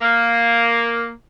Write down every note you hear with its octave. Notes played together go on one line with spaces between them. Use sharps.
A#3